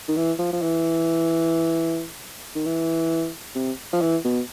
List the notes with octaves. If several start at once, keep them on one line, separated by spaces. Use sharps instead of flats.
D#3
E3
F3
F3
E3
D#3
E3
C3
F3
E3
B2